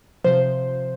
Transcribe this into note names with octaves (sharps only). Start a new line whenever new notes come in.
C3 F3 C5